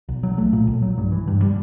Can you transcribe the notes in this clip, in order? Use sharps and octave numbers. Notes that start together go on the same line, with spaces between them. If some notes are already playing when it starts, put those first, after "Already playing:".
B1
F#3
A3
A#2
B1
F#3
G2
E3
G2
G3